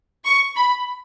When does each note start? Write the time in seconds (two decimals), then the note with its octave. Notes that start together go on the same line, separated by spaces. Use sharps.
0.25 C#6
0.56 B5